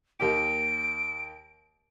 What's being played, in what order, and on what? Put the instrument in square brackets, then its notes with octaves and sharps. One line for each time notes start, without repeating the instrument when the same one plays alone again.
[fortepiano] D#2 A#3 G4 [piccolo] D7